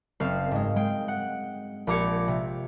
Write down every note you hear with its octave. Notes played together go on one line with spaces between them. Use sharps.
F#1 C4 F5
G#2 G#3
G#3 G5
F#5
A#1 G4 A#5 D6 G#6 C#7
C3